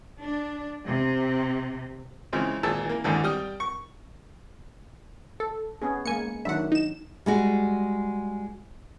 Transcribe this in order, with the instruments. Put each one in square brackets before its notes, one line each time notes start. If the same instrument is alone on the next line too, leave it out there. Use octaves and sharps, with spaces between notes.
[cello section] D4
C3
[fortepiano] C#3 E3 F3 G#3 C4
G#1 A#2 G#4 A5 E6
E3 A#3
D#2 G#2 D3 E3
G3 G5 D#6 F6
C#6
[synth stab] A4
[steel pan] B3 C#4 G#4
[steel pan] G#3 A#3 [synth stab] G#5 C#7
[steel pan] D#3 F#3 D4 [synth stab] E5 F#5
[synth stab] D#4 E7
[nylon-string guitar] G3 G#3 F#4